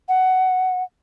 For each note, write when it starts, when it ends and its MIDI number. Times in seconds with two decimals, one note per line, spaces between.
0.08 0.83 78